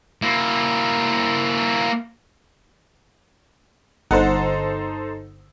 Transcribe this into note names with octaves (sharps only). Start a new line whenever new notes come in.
A#3 E4
G1 D#4 A4 C5 F#5